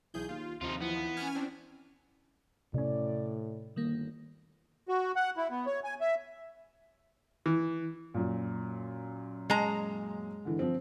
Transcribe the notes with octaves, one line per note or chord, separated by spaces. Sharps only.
B1 E3 G#4 G6
D#2 F4
D#2 C3 F3 D#4 F4
E3 B3
C#4 E4 G#5 F6
C4 D4
A2 C3 C#4 D5
G1 D#3 G3 A#3
F#4
F#5
E4
B3
C#5
G#5
E5
E3
F#2 A#2
G#3 A#5
D3 E3
F3 C4